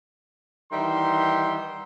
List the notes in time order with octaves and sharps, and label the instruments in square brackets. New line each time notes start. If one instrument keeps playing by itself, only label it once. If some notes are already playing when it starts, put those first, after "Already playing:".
[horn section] D#3 E3 G3 E5 F#5 C6